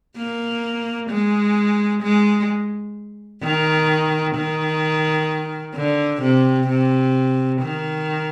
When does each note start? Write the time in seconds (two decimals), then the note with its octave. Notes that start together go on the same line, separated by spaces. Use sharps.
0.17 A#3
1.10 G#3
2.03 G#3
3.43 D#3
4.36 D#3
5.75 D3
6.22 C3
6.68 C3
7.62 D#3